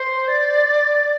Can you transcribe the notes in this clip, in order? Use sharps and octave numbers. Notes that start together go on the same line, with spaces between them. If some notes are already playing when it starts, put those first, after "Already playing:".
Already playing: C5
D5